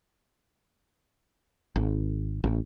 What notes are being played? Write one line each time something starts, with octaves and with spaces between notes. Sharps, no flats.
G#1
A1